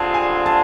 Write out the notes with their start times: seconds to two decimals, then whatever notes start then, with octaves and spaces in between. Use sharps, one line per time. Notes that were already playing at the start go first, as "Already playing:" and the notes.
Already playing: D3 G3 C4 F4 G#4 A5
0.14 G#5
0.46 A5